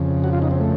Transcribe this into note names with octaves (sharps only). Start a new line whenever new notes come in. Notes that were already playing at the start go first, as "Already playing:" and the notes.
Already playing: F2 C#3
F#4
F4
D#4
C4
A3